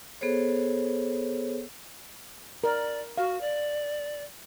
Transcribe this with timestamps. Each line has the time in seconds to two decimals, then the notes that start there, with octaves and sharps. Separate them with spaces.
0.21 B3 G#4 A4 C5 C#5
2.64 A#4 D5
3.18 F#4 F5
3.41 D5